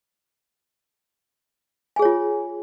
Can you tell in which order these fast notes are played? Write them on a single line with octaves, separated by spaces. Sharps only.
G#5 G#4 C#5 F4